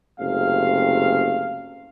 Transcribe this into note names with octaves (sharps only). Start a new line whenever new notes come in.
F#1 C3 A3 F5